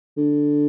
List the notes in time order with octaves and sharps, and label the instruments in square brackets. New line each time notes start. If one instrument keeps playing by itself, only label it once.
[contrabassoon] D3